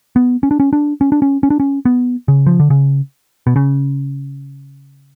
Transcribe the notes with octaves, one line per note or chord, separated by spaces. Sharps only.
B3
C#4
D4
C#4
D4
C#4
D4
C#4
C#4
D4
C#4
B3
C#3
F3
D3
C#3
B2
C#3